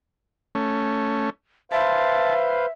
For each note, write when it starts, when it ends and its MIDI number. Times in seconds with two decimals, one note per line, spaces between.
0.55 1.30 57
0.55 1.30 61
1.72 2.66 71
1.72 2.66 72
1.72 2.71 76
1.72 2.66 77
1.72 2.34 81